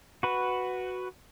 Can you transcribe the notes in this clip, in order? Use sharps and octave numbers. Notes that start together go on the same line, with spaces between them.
F#4 B4